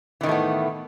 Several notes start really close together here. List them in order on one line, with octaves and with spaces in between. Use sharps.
E3 D#3 A2 A3 B3